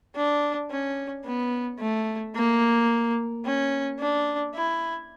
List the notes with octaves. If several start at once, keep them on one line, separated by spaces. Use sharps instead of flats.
D4
C#4
B3
A3
A#3
C#4
D4
E4